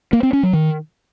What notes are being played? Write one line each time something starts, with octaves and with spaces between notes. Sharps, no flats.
A#3
C4
C#4
F#3
D#3